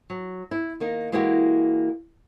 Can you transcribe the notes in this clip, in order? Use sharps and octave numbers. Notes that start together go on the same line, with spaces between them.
F#3
E4
D#3 A#3 D#4
E3 G#3 A#3 E4 F#4 G4